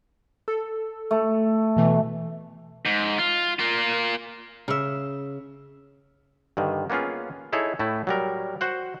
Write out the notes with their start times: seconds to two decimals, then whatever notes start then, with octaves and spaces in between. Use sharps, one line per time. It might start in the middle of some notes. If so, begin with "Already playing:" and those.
0.48 A4
1.11 A3
1.76 B2 E3 A3
2.85 G#2
3.18 F4
3.59 A#3 F4
4.68 C#3 E5
6.57 G2 D3 D#3
6.90 A#3 B3 C#4 F4 G#4
7.53 D#4 E4 G#4 A4 C#5
7.79 A2 A3 E4
8.07 F#3 G3 A#4
8.61 F#4 C5 F#5